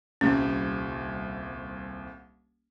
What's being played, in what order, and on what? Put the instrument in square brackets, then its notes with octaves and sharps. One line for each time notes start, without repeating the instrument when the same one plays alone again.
[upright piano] D#1 C2 [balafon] C#4